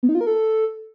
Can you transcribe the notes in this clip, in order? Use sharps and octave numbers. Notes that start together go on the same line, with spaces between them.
B3
D#4
F4
A#4
A4